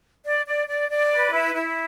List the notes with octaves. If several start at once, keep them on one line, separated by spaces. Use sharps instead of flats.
D5
D5
D5
D5
B4
E4
E4